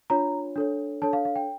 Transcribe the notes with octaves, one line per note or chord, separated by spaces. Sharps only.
D4 F4 C#5 A#5
D4 A4 C#5
D4 A4 C#5 A5
F5
F5
G5